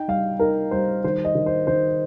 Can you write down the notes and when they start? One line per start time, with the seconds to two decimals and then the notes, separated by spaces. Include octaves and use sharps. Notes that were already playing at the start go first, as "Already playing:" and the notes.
Already playing: D#4 G5
0.08 G3 F5
0.40 D#4 A#4
0.71 G3 C5
1.04 D#3 C5
1.24 D#5
1.35 D#3
1.46 C5
1.67 D#3 C5